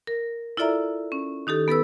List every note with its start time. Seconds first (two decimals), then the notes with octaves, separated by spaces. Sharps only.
0.07 A#4
0.57 E4 F4 A4 D5 E5 A#5
1.12 C#4
1.47 D#3 D#4 G4 A4
1.68 B3 A4 B4 E6